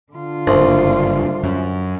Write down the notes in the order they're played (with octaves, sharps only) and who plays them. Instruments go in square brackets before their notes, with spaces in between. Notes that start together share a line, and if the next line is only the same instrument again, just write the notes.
[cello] D3 F4
[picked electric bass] F#1 G2 [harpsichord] C2
[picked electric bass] F#2